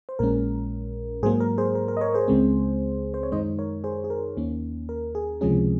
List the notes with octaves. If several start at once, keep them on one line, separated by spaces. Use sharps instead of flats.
C5
A#1 A#2 G#3 C#4 A#4
G#2 F#3 A#3 G#4 C5
A#4
G#4 C5
A#4
A#4
D#5
A#4 C#5
G#4 C5
C#2 C#3 G#3 C4
C5
C#5
F#2 D#3 G#3 D#4 C5 D#5
A#4 C#5
G#4 C5
G#4
A#4
D#2 D#3 A#3 C#4
A#4
G#4
C#2 C3 F3 G#3 C#4 G#4